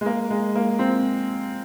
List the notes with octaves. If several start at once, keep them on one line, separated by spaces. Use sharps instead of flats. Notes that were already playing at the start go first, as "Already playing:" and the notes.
G#3
A#3
G#3
A#3
C4